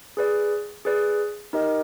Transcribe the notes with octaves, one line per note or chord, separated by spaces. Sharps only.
G#4 B4 D5
G#4 B4 D5
D#4 G4 A#4 D#5